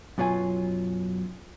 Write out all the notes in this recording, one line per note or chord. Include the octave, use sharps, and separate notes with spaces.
F#2 B2 F#3 F4 G#5